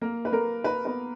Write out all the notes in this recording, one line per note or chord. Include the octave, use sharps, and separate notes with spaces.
A#3 A#4
B4
A#3 A#4
B4
B3 B4